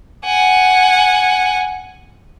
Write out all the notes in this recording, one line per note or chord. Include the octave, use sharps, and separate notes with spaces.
F#5 G#5